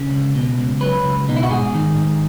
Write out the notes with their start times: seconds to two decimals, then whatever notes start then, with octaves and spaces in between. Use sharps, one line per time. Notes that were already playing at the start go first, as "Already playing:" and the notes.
Already playing: C#3
0.11 C#2
0.35 B2
0.58 C#2
0.81 F#3 B4
1.04 C#2
1.28 B2 D#4
1.36 E4
1.43 F#4
1.50 G#2 G#4
1.74 D#3
1.97 G#2